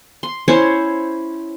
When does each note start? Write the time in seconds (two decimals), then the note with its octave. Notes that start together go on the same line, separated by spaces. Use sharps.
0.23 C6
0.48 C#4 E4 C5 C#5